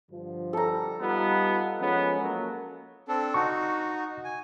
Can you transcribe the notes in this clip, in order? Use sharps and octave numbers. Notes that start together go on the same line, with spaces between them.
G2 D3 F3
G3 A4 A#5
G3 B3 D#4 F4
F3 G#3 B3 C#4
F#3 A#3
C4 D4 A4
D#4 F#4 C#6
G#5